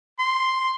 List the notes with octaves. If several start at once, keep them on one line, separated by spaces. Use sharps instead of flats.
C6